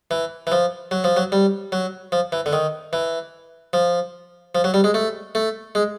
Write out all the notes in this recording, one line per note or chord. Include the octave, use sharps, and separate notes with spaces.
E3
E3
F3
F#3
F3
F#3
G3
F#3
F3
E3
D3
D#3
E3
F3
F3
F#3
G3
G#3
A3
A3
G#3